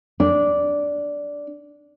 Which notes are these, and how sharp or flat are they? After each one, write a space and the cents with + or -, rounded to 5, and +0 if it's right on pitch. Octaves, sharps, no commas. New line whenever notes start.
D4 -10